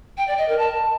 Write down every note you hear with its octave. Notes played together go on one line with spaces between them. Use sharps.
G5
D5
D#5
A#4
A5